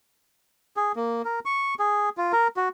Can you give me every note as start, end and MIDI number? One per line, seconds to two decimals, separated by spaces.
0.77 0.92 68
0.96 1.22 58
1.25 1.40 70
1.45 1.74 85
1.79 2.09 68
2.17 2.32 65
2.33 2.48 70
2.57 2.69 66